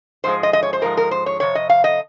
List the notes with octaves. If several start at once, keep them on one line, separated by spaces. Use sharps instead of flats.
G#2 F3 G#3 C5
D#5
D#5
C#5
C5
G#2 F3 G#3 A#4
A#4
C5
C#5
F2 C3 C#5
D#5
F5
D#5